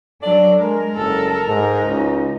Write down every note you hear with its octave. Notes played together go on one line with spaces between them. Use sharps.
F#3 D4 A4 D5
G#3 A#4
F#1 A4
G#2 D#4
C#2